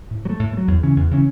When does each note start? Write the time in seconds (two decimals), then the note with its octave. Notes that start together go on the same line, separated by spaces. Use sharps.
0.11 A2
0.25 F#3
0.30 A3
0.39 A2
0.53 A3
0.57 F#3
0.68 E2
0.83 C#3 E3 C#4
0.96 E2
1.11 C#3 E3 C#4